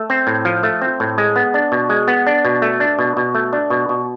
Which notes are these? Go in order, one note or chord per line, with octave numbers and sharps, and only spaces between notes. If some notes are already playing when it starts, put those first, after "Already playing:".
Already playing: A3
C4
A2
F3
A3
C4
A2
G#3
B3
D4
B2
G#3
B3
D4
B2
A3
D4
B2
B2
A3
D4
B2
B2